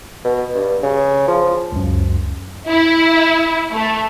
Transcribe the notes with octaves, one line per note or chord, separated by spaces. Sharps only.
B2
G2
C#3
F3
C#2 F#2
E4
A3